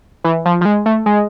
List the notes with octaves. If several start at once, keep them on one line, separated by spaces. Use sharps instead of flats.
E3
F3
F3
G#3
A3
G#3